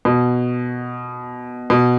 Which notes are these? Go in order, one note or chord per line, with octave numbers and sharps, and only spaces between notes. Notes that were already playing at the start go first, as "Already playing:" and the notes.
B2
B2